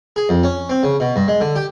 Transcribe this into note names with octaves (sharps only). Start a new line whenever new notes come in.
G#4
F2
C#4
C4
C#3
B2
G2
G#3
D3
G4